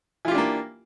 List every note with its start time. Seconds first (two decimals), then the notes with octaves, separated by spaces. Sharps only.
0.25 E3
0.28 F4
0.31 G4
0.35 D4
0.38 A#3